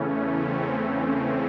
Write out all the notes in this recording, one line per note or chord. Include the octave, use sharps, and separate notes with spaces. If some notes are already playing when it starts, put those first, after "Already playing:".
Already playing: E2 C#3 E3 A3 C#4
C4
C#4